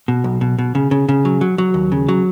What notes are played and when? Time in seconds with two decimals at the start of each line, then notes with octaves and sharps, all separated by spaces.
0.08 B2
0.24 B1
0.41 B2
0.59 B2
0.75 C#3
0.91 C#3
1.09 C#3
1.25 F#3
1.41 F#3
1.58 F#3
1.74 D#2
1.92 C#3
2.09 F#3